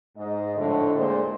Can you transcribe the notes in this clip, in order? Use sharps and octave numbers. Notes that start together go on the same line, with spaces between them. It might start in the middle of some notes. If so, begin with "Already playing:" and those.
G#2 D#5
F2 A2 D3
A#2 G#3 C5